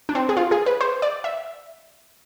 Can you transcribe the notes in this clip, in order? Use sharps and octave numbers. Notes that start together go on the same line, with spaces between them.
D4
C4
G#4
F4
G#4
B4
C5
D5
E5